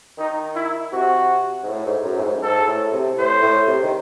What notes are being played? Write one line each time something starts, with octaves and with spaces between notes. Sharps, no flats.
D#3 D#4
E4
C3 F#4
G#2
A2
G#2
F#2
A2
G#2
G#2 A4
A2
C3
A2 C5
A2
C3
D#3